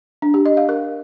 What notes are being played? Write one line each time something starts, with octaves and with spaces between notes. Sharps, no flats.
D4
G4
D#5
F5
A#4